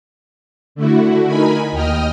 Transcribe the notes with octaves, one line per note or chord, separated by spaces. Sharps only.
D3 A3 E4 F#4
D#4 A#4 G#5 B5
D#2 D#5 G5 D#6 F6